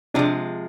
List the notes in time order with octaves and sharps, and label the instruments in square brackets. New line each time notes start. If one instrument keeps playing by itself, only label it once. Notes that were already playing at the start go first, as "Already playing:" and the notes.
[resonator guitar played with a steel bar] C3 F3 G#3 [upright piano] D4